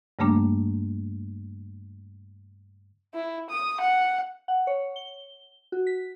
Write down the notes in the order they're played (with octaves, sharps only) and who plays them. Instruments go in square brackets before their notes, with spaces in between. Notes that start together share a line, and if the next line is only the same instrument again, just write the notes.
[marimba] G2 C#3 G3 A3 A#3 D4
[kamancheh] E4
D#6
F#5
[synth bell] F#5
C#5
G7
F#4
B6